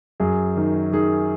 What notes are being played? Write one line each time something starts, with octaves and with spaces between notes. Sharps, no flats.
F#2 G#4
D#3
D#3 G#4